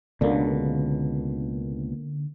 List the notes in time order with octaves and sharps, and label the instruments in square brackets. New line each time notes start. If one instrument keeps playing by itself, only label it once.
[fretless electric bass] C#2 B2 [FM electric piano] D3 A#3